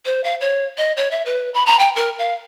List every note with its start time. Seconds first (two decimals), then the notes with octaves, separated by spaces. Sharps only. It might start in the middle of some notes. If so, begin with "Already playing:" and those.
0.05 C5
0.24 F5
0.41 C#5
0.78 D#5
0.97 C#5
1.11 E5
1.26 B4
1.54 B5
1.66 A#5
1.79 G5
1.96 A#4
2.19 F5